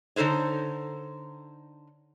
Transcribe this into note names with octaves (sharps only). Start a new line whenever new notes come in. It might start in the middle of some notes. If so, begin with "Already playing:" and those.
D3 D#4 A4 C5 C#5